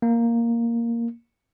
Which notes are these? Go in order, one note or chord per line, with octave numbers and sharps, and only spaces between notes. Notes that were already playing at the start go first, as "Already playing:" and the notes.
A#3